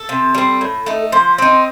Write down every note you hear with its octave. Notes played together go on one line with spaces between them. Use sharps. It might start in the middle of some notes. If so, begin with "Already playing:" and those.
Already playing: A4
C3
G3 C4
A2
A3 D#4
F3 C5
C4 D#4